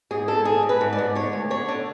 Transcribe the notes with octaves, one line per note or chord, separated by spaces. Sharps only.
G#2 G#4
G#2 A4
G#2 G#4
G#2
B4
G#2
D5
G#2
D3 C#5
D2
D3 C#5
D3